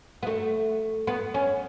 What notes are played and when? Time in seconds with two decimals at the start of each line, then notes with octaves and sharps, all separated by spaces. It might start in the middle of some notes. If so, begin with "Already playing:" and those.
0.23 B3
0.27 A3
1.07 B3
1.34 C#4